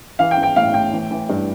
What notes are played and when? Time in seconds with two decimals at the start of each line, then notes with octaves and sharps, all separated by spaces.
0.19 E3 F5
0.31 G5
0.37 E3
0.43 G5
0.56 A2 F5
0.74 A2 G5
0.93 E3
1.11 E3
1.29 G2